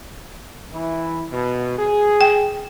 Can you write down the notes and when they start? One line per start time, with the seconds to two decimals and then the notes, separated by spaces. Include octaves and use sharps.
0.73 E3 E4
1.31 B2
1.77 G#4
2.21 G5